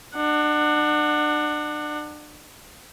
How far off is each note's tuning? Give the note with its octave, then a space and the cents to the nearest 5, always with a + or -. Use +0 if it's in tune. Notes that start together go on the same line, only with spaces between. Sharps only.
D4 +35 F#5 +0